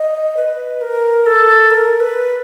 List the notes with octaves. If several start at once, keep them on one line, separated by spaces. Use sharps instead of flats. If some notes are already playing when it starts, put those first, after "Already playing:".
Already playing: D#5
B4
A#4
A4
A#4
B4